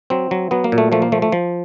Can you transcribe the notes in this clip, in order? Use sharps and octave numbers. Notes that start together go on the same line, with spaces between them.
F#3 C4
F#3
F#3 B3
A#3
A#2
A3
F3 A3
A#3
F3 A3
A3
F3